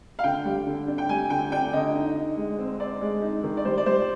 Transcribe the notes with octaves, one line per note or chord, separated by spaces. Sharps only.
F5
D3 G5
G3
D3
D4
G5
G3 G#5
D3 G5
D4 G5
D3 D#5
D#4
D#4
G#3
C4
C4 D5
G#3
D#4
D#3
D5
G3 C5
D5
G3 C5